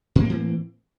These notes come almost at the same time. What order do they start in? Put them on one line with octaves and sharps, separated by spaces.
A2 A#3 C4 E3